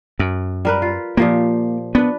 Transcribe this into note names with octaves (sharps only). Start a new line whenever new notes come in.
F#2
G3 A#4 B4
F4
A#2 F3 A#3 G4
B3 D4 B4